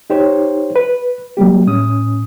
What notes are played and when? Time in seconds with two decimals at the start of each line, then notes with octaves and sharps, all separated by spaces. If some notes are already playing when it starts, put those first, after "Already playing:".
0.10 D#4 G4 C5 C#5
0.76 B4
1.37 F#3 G3 A#3 G4
1.67 A2 C#4 D#6